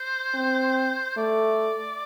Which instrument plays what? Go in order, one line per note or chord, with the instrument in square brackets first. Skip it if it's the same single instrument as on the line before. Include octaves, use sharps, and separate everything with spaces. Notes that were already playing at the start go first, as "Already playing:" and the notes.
Already playing: [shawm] C5
[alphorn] C4
[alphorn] A3 [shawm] D5